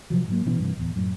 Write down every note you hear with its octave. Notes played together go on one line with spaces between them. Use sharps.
C3 F3 F#3
G#2 F#3 A#3
A1 B2 E3 C#4
G2 C3 E3
D1 E2
F#2 A2